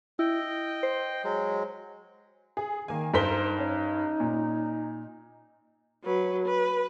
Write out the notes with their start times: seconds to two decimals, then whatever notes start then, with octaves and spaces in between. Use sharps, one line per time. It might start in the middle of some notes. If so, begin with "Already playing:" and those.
0.19 E4 D#5 G5
0.83 C5
1.24 F#3 G#3
2.57 G#4
2.88 D#3 A#3 G#5
3.14 G2 D#4 A4 A#4 C5 B6 G7
3.59 C#4
4.20 A#2
6.04 F#3 B4
6.46 B4